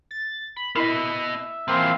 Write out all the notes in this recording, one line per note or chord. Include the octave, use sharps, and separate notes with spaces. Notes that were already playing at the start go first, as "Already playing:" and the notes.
A6
B5
B3 E4 A#4 D#5 E5
E3 F3 A#3 C4 F5